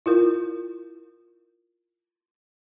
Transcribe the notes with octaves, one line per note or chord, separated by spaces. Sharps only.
E4 F4 A#4